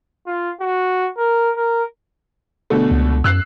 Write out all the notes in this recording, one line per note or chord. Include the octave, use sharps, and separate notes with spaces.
F4
F#4
A#4
A#4
B2 D3 A3
C#2
F#2 E6 F#6 C7